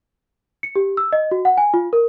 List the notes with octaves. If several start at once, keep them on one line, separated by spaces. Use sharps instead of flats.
C#7
G4
E6
D#5
F#4
F#5
G#5
F4
A#4